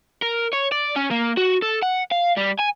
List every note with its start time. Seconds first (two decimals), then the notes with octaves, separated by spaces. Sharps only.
0.22 A#4
0.53 C#5
0.72 D5
0.96 C#4
1.11 A#3
1.37 F#4
1.62 A4
1.83 F#5
2.12 F5
2.38 G3
2.59 G#5